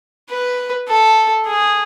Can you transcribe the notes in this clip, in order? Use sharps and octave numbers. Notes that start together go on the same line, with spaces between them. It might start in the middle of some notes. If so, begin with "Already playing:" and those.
B4
A4
G#4